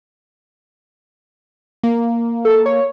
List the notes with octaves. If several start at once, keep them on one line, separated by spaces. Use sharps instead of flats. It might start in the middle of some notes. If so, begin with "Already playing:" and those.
A#3
A4
C#5